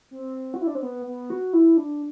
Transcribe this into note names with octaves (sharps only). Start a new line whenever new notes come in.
C4
F#4
E4
D4
C4
B3
B3
F#4
E4
D4